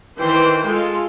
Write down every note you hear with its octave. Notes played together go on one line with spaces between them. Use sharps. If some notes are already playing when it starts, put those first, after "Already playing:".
D#3 E3 C5 G5
G#3 F4 A4